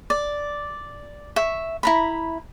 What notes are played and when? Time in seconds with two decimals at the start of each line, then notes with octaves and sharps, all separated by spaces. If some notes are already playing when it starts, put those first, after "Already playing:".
0.10 D5
1.36 E5 C#6
1.83 E4 A#5 B5